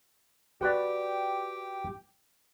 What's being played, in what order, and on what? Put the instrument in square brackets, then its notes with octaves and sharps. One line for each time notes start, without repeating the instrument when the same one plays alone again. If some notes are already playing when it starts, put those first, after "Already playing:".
[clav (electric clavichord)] F#4 B4 D5 [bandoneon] G4 G5